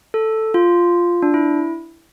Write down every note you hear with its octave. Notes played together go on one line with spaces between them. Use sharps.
A4
F4
D4
E4